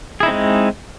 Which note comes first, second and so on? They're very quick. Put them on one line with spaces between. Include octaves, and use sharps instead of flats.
G#4 E4 D#4 C4 G#3